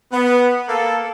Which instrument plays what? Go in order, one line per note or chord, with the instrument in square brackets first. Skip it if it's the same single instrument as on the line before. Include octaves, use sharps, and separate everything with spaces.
[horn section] B3
A#3 A4